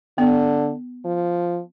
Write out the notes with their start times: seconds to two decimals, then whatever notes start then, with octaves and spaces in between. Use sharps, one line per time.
0.18 D3 B3
1.05 F3